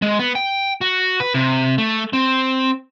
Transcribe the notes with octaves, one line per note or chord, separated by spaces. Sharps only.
G#3
B3
G5
F#4
B4
C3
A3
C4